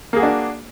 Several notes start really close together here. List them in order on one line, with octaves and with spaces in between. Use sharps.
A#3 G#4 F#4 D4